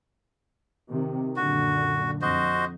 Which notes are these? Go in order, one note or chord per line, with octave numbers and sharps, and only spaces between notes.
C3 D#3
F#2 A#2 D3 F#4
F2 F#4 C5 D#5